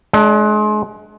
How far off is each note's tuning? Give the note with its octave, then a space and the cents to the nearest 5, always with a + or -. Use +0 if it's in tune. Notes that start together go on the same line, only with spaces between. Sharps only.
G#3 +35 D4 +0